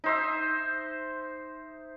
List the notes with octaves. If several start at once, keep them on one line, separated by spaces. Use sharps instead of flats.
D#4 C5 E5